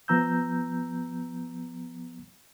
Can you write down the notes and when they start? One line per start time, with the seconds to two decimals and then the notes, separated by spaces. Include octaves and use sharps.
0.08 F3 B3 A#5 E6 G6